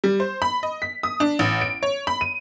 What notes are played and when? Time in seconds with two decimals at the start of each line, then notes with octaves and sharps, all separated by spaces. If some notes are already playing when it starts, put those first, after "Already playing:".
0.04 G3
0.20 C5
0.42 B5
0.63 D#5
0.82 B6
1.03 D#6
1.20 D4
1.39 A1
1.61 D7
1.83 C#5
2.07 B5
2.21 D#7